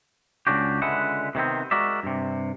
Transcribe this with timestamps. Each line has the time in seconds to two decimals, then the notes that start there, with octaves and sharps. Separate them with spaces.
0.47 C#2 G#2 C#3 D4 F#4 G4
0.82 C#2 D3 G#3 B4 E5 F#5
1.35 C3 D#3 B3 C4
1.71 G#3 F#4 A#4 D5 E5
2.03 G2 C3